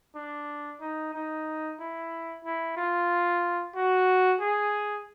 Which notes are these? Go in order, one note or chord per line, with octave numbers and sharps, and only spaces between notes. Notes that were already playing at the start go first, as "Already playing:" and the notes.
D4
D#4
D#4
E4
E4
F4
F#4
G#4